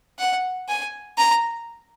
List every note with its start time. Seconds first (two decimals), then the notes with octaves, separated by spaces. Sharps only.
0.19 F#5
0.69 G#5
1.18 A#5